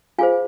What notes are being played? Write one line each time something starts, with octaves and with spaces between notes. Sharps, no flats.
F4 G#4 C5 F5 G#5